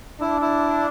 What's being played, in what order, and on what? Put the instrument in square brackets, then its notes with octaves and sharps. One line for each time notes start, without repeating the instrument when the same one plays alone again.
[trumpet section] D4 [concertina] E4
[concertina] E4